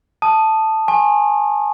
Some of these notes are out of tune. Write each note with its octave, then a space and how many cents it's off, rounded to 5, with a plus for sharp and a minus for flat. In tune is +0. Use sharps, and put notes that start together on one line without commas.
A5 +0 D#6 -15
G#5 +0 C#6 -45